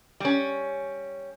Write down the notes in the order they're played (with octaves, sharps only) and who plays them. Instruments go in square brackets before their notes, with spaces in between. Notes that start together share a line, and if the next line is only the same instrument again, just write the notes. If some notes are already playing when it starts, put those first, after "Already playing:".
[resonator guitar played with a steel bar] G3 C#4